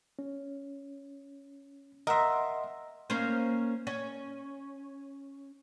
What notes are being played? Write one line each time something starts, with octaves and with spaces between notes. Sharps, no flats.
C#4
A#4 D#5 E5 F#5 C6
A#3 C#4 C5
C#4